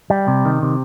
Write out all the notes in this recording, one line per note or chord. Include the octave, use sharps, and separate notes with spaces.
G3
C3
D#3
C3